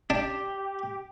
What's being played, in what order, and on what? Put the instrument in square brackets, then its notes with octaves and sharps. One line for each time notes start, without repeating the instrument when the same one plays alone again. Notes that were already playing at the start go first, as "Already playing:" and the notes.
[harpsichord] D4 [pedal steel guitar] G4